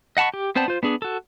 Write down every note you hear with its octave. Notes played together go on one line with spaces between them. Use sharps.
D#5 F#5 A5 B5 C#6
G4
B3 C4 C5 D5 A5
F4 C5
B3 D4 G#4
F#4 A4